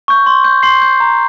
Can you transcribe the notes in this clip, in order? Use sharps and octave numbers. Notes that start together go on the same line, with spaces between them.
C#6 G6
C6
G6
C6 C7
G6
A#5